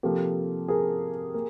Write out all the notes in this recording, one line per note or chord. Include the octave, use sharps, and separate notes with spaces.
C3 F3 A#3 G4 A4
G#4 A#4
A#3